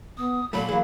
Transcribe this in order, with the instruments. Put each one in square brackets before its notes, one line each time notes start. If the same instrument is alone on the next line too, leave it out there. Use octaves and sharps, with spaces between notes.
[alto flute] B3 [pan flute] D#6
[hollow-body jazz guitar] A#2 F#3 A3 [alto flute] A4 [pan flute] B5
[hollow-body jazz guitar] E3 F#3 [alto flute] A#3 [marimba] G#4 F5